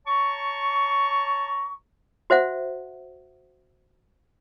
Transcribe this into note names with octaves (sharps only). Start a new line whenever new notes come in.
C#5 A5 A#5 C#6
F#4 C5 E5 F#5